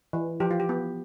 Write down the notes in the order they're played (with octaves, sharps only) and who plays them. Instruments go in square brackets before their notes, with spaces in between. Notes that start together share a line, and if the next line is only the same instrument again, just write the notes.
[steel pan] E3
F3 G4
F4
G4
B3